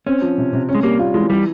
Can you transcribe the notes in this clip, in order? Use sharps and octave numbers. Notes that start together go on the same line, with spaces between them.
C4 C#4
F3
C3
C3
C#4
G#3
G3 A#3
F4
E3 G#3
E3 G3